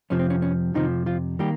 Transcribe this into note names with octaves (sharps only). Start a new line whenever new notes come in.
F2 C3 F3 C#4
C4
C#4
C#4
F2 C3 D#3 F3 D#4
F3 F4
D#3 G3 A#3 G4